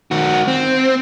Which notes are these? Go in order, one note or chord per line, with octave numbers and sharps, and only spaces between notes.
D#3 F#4
C4